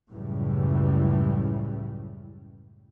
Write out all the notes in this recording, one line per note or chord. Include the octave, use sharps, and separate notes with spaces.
C#2 F#2 A2 E3 G3